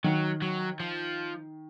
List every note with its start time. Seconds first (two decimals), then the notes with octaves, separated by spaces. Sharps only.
0.04 D#3 F#3
0.42 F#3
0.80 F3